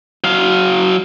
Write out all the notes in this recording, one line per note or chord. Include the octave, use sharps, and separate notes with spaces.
F#3 F5